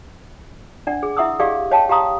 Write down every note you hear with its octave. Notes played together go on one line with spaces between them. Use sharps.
D4 D5 F#5
G#4
E4 E5 F#5 C6 D#6 E6
G4 G#4 D5 D#5 F5 C#6
C#5 D#5 F5 G5 A5
G4 F5 A#5 D#6